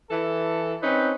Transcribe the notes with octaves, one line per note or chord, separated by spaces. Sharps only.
E3 A4
C4 C#4 D#4 B4